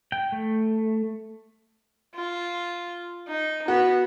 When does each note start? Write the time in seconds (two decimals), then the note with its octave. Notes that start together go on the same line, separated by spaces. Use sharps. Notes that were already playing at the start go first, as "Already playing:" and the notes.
0.12 G5
0.32 A3
2.15 F4
3.28 D#4
3.68 B3 F#4